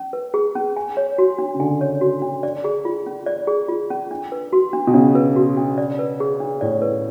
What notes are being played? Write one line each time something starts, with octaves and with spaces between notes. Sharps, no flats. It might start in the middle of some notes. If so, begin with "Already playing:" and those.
Already playing: C#4
B4
G#4
C#4
G#5
C#5
F#4
D4
C#3
D3 G#5
C#5
F#4
D4
D5
G#4
F4
C#4
D5
G#4
F4
C#4
D4
B4
F#4
D4
B2
C#3 D4
B4
F#4
D4
D5
B4
G#4
D4
A2 D5
B4